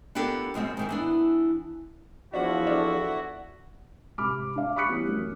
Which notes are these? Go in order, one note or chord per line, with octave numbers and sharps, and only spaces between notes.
B3 D4 F4 G4 A4 A#4
F#2 B2 G#3 C4
G#2 D#3 G#3
E3 B3 D4
E2 F3 D4 E4 F#4
D4 A4
G#2 C3 B5 D6 F6
D4 F5
B5 C#6 D#6 F#6 B6 C#7
E3 G3 B3 C#4
F#2